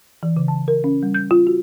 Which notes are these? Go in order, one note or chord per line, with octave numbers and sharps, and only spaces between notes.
E3
C#3
A5
A#4
C#4
G3
G6
F4
F#4